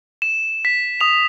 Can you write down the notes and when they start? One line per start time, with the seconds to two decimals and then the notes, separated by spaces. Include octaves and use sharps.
0.22 E7
0.65 B6
1.01 D#6 F7